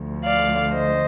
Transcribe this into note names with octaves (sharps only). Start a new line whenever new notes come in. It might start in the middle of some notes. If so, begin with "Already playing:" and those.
Already playing: D2 D3 F3
D5 F5
C5 D#5